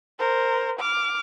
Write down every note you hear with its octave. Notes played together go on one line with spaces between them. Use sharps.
A#4 C5
D6 F6